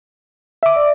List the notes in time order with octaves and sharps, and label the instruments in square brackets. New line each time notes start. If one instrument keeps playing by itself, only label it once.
[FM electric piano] E5 D6
[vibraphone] D5